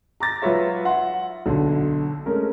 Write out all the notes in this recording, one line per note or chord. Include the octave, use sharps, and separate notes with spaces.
A#5 D6 A6 A#6
F#3 F4 B4 C#5 E5
E5 F#5 C6
B1 D3
G#3 A3 C#4 A#4